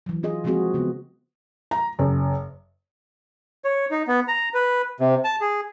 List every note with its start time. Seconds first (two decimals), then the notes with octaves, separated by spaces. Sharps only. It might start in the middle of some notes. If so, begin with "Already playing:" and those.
0.06 E3 F#3
0.23 E3 F4 G#4 D#5
0.44 F3 G#3 A#3 C4 F#4 G#4
0.74 C#3 B3
1.71 A#5
1.99 F#1
3.64 C#5
3.91 D#4
4.07 B3
4.28 A#5
4.54 B4
5.00 C3
5.24 A5
5.41 G#4